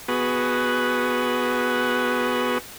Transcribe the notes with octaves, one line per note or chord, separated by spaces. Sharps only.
B3 F#4 G#4 B4